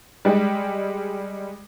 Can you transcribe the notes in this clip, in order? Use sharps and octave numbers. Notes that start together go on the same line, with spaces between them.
G3 G#3